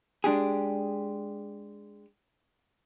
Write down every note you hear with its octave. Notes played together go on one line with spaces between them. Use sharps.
G#3 D4 G4 G#4